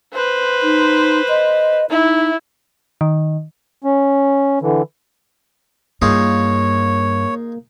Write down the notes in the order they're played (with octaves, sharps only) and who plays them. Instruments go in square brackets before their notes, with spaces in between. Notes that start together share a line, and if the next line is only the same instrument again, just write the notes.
[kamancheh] B4 C5
[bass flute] D#4
D#5
[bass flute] D#4 [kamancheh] E4
[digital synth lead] D#3
[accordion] C#4
D3 E3
[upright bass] G2 [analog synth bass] A#3 [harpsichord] D#4 F4 G#4 [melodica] C#5